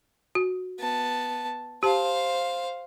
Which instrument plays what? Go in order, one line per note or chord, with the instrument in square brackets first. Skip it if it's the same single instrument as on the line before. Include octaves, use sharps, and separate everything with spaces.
[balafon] F#4
[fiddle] B3 A5
[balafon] G4 A5 [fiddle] C5 F5